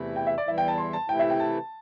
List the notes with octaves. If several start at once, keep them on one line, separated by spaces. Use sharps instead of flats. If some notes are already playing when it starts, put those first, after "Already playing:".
Already playing: E2 C3 E3 A3 E4
G5
E5
D5
E2 E3 G3 E4 E5
G5
A5
C6
A5
C3 E3 A3 E4 G5
E5
G5
A5